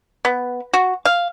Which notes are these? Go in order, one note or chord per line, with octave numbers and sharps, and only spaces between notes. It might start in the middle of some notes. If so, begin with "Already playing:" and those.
B3
F#4
F5